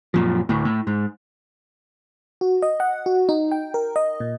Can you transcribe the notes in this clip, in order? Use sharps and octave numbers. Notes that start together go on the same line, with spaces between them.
F#2 A#2 F3
D2 A2
A2
G#2
F#4
D#5
F#5
F#4
D#4
G5
A#4
D#5
A#2